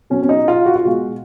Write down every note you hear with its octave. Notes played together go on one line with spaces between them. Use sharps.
B2 F#3 C#4
C#4
D#4
F4
F#4
F4
B2 G#3 F#4